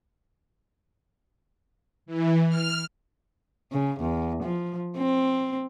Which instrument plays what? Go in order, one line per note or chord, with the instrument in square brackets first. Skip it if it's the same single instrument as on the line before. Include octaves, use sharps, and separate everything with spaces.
[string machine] E3
F6
[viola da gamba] C#3
E2
F3
C4